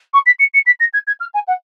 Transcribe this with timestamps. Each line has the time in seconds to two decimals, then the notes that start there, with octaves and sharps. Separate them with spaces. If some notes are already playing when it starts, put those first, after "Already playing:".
0.14 C#6
0.26 B6
0.39 C#7
0.54 C#7
0.66 B6
0.80 A#6
0.94 G#6
1.07 G#6
1.20 F6
1.34 G#5
1.48 F#5